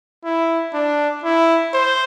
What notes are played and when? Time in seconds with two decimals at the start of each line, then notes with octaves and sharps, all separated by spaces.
0.24 E4
0.74 D4
1.24 E4
1.73 C5